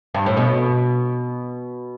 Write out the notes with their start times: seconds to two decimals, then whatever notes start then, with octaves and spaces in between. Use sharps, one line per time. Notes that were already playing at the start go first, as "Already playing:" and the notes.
0.15 G2
0.26 A2
0.37 B2